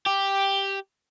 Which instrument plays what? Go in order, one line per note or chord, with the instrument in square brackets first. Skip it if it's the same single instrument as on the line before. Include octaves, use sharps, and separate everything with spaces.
[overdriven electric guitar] G4